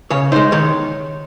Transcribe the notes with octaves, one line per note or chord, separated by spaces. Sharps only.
C#3 C#5
G#3 D#4 C5
D#3 C#5